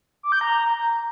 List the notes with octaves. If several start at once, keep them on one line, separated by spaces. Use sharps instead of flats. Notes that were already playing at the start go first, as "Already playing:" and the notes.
D6
G6
A#5